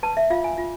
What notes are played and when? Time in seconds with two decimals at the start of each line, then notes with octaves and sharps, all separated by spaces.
0.03 B4 A5
0.17 E5
0.30 F4 F5
0.44 G#5
0.58 F4